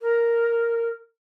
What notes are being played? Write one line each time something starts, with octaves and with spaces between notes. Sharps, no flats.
A#4